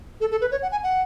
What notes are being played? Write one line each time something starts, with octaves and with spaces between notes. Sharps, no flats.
A4
A4
B4
C#5
F#5
G#5
F#5